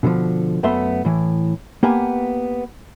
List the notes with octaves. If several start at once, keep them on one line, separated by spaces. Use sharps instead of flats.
B2 D3 D#3 F3
F#2 A3 B3 E5 C6
A2 E3
A#3 B3 G4 B4 G#5